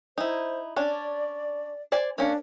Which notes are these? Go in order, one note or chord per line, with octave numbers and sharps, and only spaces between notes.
D#4 E4 C5
C#4 D4 D5
C5 D5 G#5
A#3 C#4 D4 F5